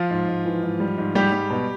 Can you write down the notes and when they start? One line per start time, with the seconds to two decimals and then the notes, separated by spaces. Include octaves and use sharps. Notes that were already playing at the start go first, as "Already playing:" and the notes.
Already playing: F3 F4
0.11 G#2
0.28 G#2
0.45 E3
0.63 G#2
0.80 G3
0.98 G#2
1.15 G#2 G3 G4
1.32 G3
1.50 B2